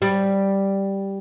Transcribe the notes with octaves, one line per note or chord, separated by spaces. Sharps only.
G3